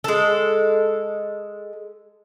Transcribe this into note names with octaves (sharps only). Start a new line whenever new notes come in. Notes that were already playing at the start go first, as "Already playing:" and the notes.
G#3 A4